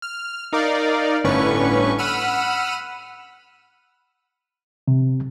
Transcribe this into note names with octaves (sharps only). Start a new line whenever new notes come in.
F6
D#4 A#4 D5 F5
G1 A2 D3 C#4 B4 C#6
F#5 B5 E6 F6 D#7
C3